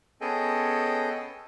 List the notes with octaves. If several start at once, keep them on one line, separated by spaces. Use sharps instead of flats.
B3 C#4 G#4 A4 D#5 G5